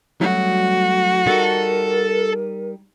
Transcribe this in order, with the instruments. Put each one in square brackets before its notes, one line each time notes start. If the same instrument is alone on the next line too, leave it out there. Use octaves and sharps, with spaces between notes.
[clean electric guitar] F#3 A3 C#4 [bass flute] G3 [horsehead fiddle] F#4
[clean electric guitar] G3 D#4 [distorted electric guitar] A4 [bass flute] A#4